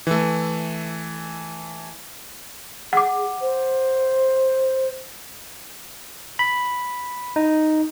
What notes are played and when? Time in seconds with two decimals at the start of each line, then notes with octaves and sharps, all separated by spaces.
0.07 E3 A3
2.93 G#4 F#5 D6
3.41 C5
6.39 B5
7.36 D#4